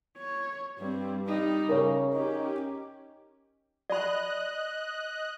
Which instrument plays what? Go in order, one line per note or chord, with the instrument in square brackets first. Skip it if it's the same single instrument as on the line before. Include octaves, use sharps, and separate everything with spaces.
[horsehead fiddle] C#5
[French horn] G2 [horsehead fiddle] G3 C4
[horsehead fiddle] G3 D#4
[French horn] C#3 [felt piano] A#4 C#5
[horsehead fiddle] C#4 G4 [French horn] D#4
[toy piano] D5 B5 [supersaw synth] D#5 F#6